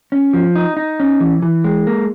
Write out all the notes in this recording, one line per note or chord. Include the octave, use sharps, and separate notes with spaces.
C#4
F3
D#4
D#4
C#4
E3
E3
G#3
A#3